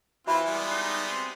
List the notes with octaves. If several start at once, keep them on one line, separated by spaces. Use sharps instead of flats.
E3 C4 F4 F#4 E5 B5
G3 G#3 B3
D#4
C4